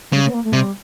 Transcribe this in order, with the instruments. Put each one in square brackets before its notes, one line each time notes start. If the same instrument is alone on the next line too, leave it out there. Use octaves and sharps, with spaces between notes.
[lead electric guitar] C#3 [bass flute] G3
[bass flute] A3
B3
A#3
A3
[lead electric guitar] C3 [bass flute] G3